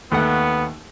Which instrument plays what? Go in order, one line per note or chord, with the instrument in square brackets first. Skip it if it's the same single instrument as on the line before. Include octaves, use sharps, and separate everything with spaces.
[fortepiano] D#2 A3 F#5 [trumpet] B3